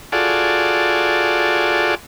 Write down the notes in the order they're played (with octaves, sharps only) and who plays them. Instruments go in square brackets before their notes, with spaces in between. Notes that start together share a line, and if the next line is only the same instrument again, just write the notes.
[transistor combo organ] F4 F#4 G#4 A4 D5